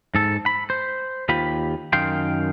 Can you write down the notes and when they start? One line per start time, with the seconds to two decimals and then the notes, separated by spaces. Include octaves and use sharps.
0.15 G#2 A4
0.46 B5
0.70 C5
1.29 D#2 F4 G4 B5
1.93 F#2 D#3 F5 G5 C6